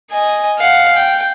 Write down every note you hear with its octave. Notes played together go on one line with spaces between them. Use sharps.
D#5 G#5
F5 F#5
G5